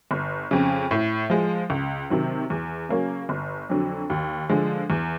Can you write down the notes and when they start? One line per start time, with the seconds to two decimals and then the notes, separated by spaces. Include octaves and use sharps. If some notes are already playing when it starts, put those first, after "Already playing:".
0.11 G1
0.51 F2 C#3
0.91 A2
1.30 F3 G#3
1.70 C#2
2.10 C3 D#3 F#3
2.50 E2
2.89 C#3 F#3 A#3 C#4
3.29 G1
3.70 F2 D3 F#3
4.10 D#2
4.49 D3 F3 G#3
4.90 E2